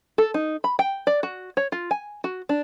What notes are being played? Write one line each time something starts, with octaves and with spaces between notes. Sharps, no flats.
A4
D#4
B5
G5
D5
F#4
C#5
F4
G#5
F#4
D4